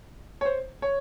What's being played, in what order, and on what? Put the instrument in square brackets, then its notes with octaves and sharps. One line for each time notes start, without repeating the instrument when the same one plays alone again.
[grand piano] C#5
C5
C#5